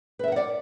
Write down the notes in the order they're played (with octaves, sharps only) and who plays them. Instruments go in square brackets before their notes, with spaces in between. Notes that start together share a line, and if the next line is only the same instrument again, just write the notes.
[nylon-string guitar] B4
E5
A#4
F#5
D5